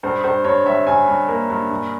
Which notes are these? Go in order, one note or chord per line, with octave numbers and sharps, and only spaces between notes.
G2 C5
G2 C5
G2 C#5
G2 E5
G2 G#5
G2
A#3
G2
G2